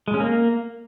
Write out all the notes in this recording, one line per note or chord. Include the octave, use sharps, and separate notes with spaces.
G#3
C#4
A#3